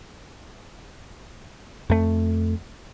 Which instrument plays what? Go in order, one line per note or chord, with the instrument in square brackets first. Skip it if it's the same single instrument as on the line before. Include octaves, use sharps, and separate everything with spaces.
[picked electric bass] F2 A3